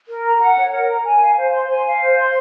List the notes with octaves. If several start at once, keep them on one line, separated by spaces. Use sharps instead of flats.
A#4
A#5
F#5
C#5
A#4
A#5
G#5
F5
C5
C6
G#5
F5
C5
C6